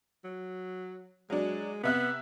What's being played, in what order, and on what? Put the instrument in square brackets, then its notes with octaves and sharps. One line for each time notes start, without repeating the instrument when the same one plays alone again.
[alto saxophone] F#3
[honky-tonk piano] F#3 D4 [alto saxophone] G#3
[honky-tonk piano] C3 E5 F#6 [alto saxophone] B3